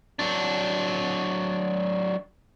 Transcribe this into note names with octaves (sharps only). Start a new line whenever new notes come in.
F#3 D4